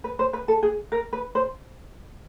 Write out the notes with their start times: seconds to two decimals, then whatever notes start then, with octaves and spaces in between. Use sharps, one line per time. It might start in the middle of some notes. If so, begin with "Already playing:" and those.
0.04 B4
0.19 C5
0.33 B4
0.48 A4
0.63 G#4
0.92 A#4
1.13 B4
1.35 C5